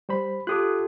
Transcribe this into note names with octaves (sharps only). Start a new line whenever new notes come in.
G3 C5 B5
F4 G4 A4 D6 D#6 F#6